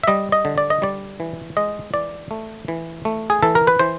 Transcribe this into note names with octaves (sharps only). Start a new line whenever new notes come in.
E5
G3 D#5
D#5
D3
D5
D#5
G3 D5
E3
G#3 D#5
E3 D5
A3
E3
A3
G#4
E3 A4
A#4
B4
E3 C5